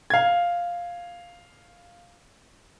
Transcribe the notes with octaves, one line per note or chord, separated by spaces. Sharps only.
F5 G#6